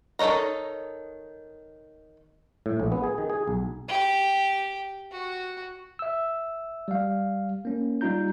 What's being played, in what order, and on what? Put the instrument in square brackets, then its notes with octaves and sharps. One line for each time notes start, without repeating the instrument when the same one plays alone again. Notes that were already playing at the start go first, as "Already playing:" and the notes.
[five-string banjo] D#3 A4 C#5 D#5 A#5
[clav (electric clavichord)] A2
A#1
B3
G#4
D#3
G#4
B1
[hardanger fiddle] G4
F#4
[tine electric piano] E5 E6
G3 F5
A#3 C#4
G3 D#4 F4 A#5 G6